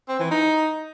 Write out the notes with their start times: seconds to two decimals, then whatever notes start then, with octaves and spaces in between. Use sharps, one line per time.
0.09 C4
0.20 E3
0.31 D#4